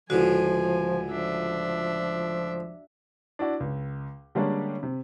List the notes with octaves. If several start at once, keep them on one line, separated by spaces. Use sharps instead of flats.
C#2 A2 D3 F3 F#4 G#5
F3 D4 E5
D4 E4 F#4 D5
C#2
D3 G3 G#3 A#3 C#4 D4
C3